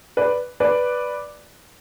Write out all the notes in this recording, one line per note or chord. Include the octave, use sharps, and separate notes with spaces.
B4 D5
B4 D5